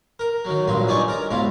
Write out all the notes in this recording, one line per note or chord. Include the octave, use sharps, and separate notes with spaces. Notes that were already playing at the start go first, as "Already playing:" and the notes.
A#4
D#3 F#3
A#1 G2 F#3 C6
G2 D#4 D5 D#5 G#5 C#6
A#4 A#5
B1 G#2 E4 F4